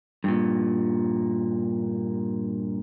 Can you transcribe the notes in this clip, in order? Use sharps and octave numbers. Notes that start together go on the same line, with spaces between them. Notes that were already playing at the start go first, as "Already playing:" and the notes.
G2 A#2